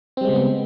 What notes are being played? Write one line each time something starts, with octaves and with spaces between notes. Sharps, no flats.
C#3 G3 G#3 B3 C4